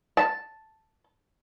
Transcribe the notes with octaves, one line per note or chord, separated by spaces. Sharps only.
A5